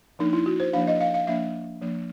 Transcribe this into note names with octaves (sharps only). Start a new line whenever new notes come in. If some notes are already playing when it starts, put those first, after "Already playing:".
F3 A#3 D4 D#4
E4
F#4
C5
F3 A#3 D4 F5
D#5
F5
F5
F3 A#3 D4 E5
F3 A#3 D4